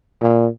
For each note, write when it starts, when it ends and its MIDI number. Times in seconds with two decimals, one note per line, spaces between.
0.22 0.47 46